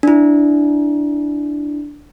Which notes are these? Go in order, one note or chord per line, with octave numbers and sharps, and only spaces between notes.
D4 E4